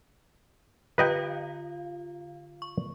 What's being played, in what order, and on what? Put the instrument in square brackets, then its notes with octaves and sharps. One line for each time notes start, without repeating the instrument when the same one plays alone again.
[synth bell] D3 F4 F5 [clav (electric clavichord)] B4 D#5 G5
[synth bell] C#6